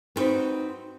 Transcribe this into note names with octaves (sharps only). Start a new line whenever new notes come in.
B3 C4 D#4 F#4 B4